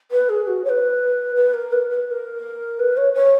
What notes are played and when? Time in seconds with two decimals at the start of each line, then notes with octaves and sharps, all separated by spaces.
0.11 B4
0.29 G#4
0.47 F#4
0.64 C#5
0.69 B4
1.36 B4
1.54 A#4
1.72 B4
1.90 B4
2.07 B4
2.11 A#4
2.79 B4
2.97 C#5
3.14 C#5